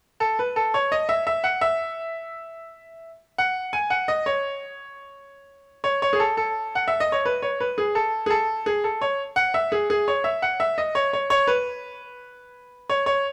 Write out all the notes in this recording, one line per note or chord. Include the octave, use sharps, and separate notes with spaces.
A4
B4
A4
C#5
D#5
E5
E5
F#5
E5
F#5
G#5
F#5
D#5
C#5
C#5
C#5
G#4
A4
A4
F#5
E5
D#5
C#5
B4
C#5
B4
G#4
A4
G#4
A4
G#4
A4
C#5
F#5
E5
G#4
G#4
C#5
E5
F#5
E5
D#5
C#5
C#5
C#5
B4
C#5
C#5